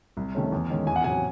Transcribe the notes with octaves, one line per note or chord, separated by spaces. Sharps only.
C2
C3 D#3 A3 C#4
E2
D#3 G#3 C#4
E2 G#5
F#5
C3 F#3 C#4 G#5